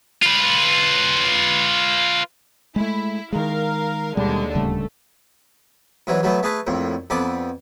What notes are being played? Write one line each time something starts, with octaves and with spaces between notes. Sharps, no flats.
F4 B4
G#3 A3 E4
D#3 G#3 A#4 F5
D#2 B2 D3 G3 G#3
D1 C#3 G3 A3
G#2 E3 F#3
F#3 A3 B3
A3 G#4 B4 A5
A#1 F2 A2
F2 B3 A4 D5